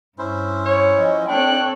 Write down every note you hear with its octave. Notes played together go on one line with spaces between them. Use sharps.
G2 C#4 E4 C5
C#5
F3 D#5 G#5
C4 D4 A4 C#5 G5 F#6